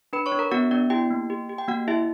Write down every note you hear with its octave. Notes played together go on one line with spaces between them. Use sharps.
D4 B4 B5
C#5 C#6
D4
A#4 A#5
B3 F#4 F#5
B3 D4 D5
E4 G4 G5
A#3
G4
G4
G5
A#3 F#4 F#5
E4 G4 E5